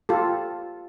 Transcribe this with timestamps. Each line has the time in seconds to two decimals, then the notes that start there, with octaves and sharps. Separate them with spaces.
0.09 F4 G4 A4